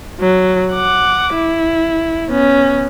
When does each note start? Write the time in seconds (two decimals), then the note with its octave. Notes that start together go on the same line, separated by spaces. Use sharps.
0.20 F#3
0.73 F#5 D6
1.35 E4
2.31 B3 C#4